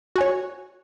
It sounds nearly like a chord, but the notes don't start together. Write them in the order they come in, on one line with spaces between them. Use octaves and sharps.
F#4 G#5 C#5